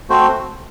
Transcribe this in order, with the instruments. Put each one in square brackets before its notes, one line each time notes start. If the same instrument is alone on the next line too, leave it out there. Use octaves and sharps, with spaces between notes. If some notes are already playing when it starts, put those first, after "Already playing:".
[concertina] A3 C4 F#4 C5